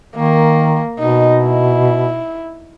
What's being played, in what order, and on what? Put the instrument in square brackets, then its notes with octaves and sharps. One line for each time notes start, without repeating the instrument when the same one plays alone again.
[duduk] D#3 [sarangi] A#3
[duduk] B2 [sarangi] D#4
[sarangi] E4